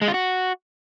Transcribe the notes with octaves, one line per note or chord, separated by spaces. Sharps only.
G#3
F4
F#4